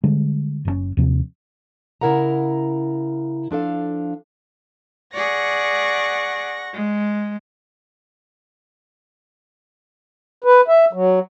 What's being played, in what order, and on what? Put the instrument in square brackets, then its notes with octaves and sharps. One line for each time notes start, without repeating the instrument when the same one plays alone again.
[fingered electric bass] D3 G3 G#3
F#1 C3 C#4
D#2 C3 F3
[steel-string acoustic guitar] C#3 E4 A#4 F#5 A#5
F3 D4 A4 F5
[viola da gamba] G#4 D5 [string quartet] F#5 C#6 A#6
[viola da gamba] G#3
[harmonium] B4
E5
F#3